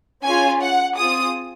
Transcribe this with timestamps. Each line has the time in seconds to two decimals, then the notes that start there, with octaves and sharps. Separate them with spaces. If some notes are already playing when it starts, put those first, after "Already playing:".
0.24 C#4 F4 G#4 G#5
0.60 F#5
0.97 C4 F4 G#4 D#6